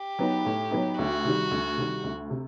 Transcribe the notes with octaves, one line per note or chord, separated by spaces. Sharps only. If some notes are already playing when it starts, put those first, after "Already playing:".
Already playing: G4
F#3 B3 D#4
A2
F#3 B3 D#4
D2 F#4
C3 D#3 G3
D2
C3 D#3 G3
D2
C3